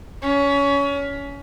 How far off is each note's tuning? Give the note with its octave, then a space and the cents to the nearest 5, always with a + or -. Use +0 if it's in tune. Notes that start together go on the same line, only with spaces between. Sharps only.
C#4 +25